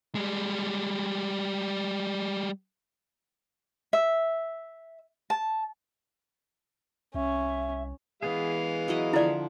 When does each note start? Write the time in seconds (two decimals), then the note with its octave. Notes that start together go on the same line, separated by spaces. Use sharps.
0.15 G3 G#3
3.93 E5
5.30 A5
7.14 C2 C#4 E5
8.23 E3 G#3 B3 G#4 F5
8.88 F#3 E4 D#5
9.13 D3 F3 E4 D5 E5